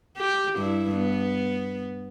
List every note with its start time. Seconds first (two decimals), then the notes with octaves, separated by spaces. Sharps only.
0.18 G4
0.57 G2 E4
0.96 B3